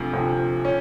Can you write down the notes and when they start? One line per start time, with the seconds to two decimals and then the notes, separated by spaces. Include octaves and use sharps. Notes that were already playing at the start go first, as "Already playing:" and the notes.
Already playing: D2 C3 F3
0.13 D2 C3 F3
0.65 C#4